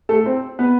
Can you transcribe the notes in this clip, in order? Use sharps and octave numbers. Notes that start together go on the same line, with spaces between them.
A3 A4
C4 C5
B3 B4